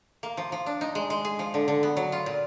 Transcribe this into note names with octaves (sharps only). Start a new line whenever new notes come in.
A#3
F3
F3
D4
D#4
G#3
G#3
G#4
F3
D3
D3
B3
F#3
F4
A#2